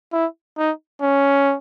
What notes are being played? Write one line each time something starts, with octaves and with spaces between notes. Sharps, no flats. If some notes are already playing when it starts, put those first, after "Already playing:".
E4
D#4
C#4